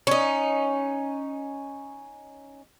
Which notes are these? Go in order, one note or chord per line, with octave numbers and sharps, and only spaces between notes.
C#4 D#4